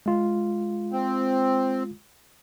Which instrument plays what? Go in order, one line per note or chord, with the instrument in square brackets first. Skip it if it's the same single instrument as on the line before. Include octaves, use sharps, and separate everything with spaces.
[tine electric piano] G#3 F4
[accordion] C4